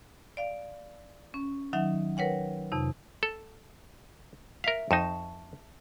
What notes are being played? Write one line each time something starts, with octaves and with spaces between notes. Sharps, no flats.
D5 F5
C#4
D#3 F#3 D#4 E5 F#5
A#4 B4 C#5 F#5 G5
F2 C3 D#4
A4
A#4 E5 F5 B6
F2 D#4 A5 C#6